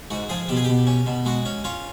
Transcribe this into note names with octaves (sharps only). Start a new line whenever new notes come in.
G#2 F#4
F3 G#4
B2 G4
G#4
B2 G4
C#4
B2
G#3 F#4
C#4
C#4 F4